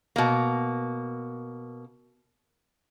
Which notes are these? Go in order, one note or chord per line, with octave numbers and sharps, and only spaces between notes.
B2 A#3